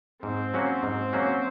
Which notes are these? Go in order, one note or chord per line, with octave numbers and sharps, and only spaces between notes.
G#2 C4
F#3 A#3 C#4 F#4
G#2
F#3 A#3 C#4 F#4